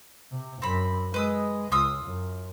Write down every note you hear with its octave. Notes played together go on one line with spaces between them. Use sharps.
C3
F#2 C4 B5
G#3 B4 D#6 E6
C#2 F4 D#6 E6
F#2